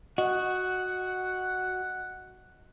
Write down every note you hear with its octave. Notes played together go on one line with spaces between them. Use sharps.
F#4 D#5 F#5